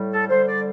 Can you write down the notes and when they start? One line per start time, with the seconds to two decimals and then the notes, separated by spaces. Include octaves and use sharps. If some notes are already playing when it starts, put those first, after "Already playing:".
Already playing: A2 G3
0.12 A4
0.29 D3 G3 C5
0.47 D5